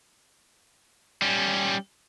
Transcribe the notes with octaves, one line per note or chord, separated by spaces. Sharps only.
G3 C#4